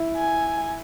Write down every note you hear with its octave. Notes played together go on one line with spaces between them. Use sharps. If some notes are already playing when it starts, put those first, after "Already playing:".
Already playing: E4
G#5